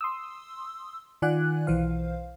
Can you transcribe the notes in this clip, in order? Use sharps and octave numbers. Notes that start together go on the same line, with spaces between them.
C6 D#6 E6
D#3 F4 D5 F#5 G#5 F#6
B1 E3 C5 F5